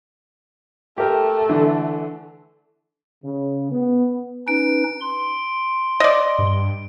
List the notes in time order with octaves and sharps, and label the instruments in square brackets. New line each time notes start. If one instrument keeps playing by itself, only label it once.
[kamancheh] A3 [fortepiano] G4 A#4 G5
[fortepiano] D3 E3
[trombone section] C#3
B3
[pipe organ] C#4 D#4 B4 [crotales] D7
[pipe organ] C6
[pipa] D5 D#5
[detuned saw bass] G2